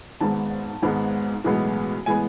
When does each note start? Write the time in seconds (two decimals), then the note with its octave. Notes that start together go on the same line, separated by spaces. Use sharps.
0.21 G#1 G#2 G#3 B3 A5
0.82 G#1 G#2 G#3 B3
1.44 B1 A2 E3 G#3 B3
2.06 A2 E3 G#3 B3 G#5